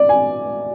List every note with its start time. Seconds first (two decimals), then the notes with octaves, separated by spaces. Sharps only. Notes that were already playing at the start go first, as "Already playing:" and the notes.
Already playing: D5
0.09 G#5